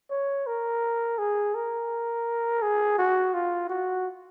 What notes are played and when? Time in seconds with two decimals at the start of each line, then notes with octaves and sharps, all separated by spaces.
0.11 C#5
0.47 A#4
1.19 G#4
1.55 A#4
2.62 G#4
2.98 F#4
3.34 F4
3.70 F#4